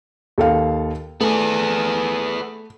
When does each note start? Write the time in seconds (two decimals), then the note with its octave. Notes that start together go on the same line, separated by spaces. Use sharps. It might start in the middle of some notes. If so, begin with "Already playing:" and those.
0.38 D#2 A4 F5
1.21 A3 B3 G#4